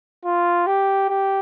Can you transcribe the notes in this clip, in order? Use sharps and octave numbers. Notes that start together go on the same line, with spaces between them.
F4
G4
G4